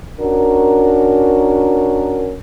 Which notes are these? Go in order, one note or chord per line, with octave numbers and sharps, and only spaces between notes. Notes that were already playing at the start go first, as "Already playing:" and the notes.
C#4 D4 F#4 A#4